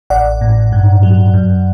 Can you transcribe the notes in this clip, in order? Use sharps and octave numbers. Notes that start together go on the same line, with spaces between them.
A1 D5 F#5
A2
G2
F#3
F#2